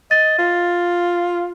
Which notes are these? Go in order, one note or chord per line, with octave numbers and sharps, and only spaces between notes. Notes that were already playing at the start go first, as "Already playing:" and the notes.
D#5 A6
F4